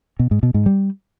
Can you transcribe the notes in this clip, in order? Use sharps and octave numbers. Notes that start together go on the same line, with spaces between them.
B2
G#2
B2
G#2
G3